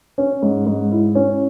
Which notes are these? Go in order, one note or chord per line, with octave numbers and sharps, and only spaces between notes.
C#4
G#2
G#2
E4
C#4